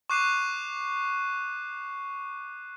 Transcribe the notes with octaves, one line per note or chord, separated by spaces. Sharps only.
C#6 D6 F#6 C7 D#7 E7